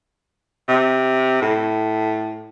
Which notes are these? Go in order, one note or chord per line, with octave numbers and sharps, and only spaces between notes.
C3
A2